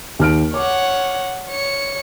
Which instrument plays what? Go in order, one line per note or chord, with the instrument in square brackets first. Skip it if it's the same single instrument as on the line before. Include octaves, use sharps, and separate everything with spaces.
[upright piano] D#2 F6 D7
[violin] C#5 F#5 [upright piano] D6
[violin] C#5 C#7